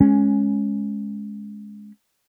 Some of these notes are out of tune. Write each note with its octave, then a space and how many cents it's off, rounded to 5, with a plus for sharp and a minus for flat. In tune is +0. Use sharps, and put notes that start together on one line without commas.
G#3 +10 C#4 +0